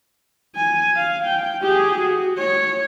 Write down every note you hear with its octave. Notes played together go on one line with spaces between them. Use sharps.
G#5
F5
G5
G4 G#4
F#4
C#5